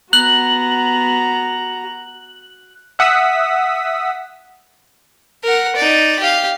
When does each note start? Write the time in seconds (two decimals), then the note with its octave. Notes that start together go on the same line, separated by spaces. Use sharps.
0.13 B3 F#4 A#5 F#6 F#7
2.99 E5 F#5 D#6 E6 B6
5.44 A#4 F#5
5.76 D#4 D5
6.20 G4 F5